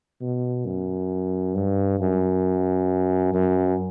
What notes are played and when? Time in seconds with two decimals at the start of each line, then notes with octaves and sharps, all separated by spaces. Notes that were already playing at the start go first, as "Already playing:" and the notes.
0.21 B2
0.66 F#2
1.55 G2
2.00 F#2
3.34 F#2